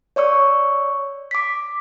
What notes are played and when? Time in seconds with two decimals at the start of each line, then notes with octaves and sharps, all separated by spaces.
0.16 C#5 D5 C#6 E6
1.31 D6 B6